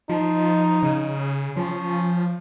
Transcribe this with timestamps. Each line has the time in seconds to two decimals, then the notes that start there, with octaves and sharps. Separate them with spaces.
0.09 F3 D#4
0.83 C#3
1.56 F3 C#4